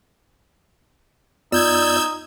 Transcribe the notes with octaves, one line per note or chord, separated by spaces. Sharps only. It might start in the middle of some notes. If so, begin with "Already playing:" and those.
F#2 B3 D#4 F4 D5 E6 G6 G#6